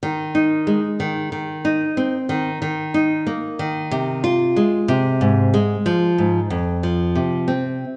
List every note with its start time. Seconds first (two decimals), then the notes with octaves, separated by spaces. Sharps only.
0.03 D#3
0.35 D#4
0.67 G#3
1.00 D#3
1.32 D#3
1.65 D#4
1.97 C4
2.29 D#3
2.62 D#3
2.94 D#4
3.27 A#3
3.59 D#3
3.91 C3
4.24 F4
4.56 G#3
4.88 C3
5.21 G#2
5.54 G#3
5.86 F3
6.18 G#2
6.50 F2
6.83 F3
7.15 C3
7.48 C4